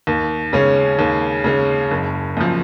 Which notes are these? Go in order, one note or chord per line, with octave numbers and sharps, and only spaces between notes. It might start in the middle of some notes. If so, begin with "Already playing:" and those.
D#2
C#3 G#3 C#4
D#2
C#3 G#3 C#4
F#1
F#2 F3